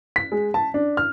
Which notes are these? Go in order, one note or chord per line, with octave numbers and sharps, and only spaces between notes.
B6
G#3
A5
D4
F6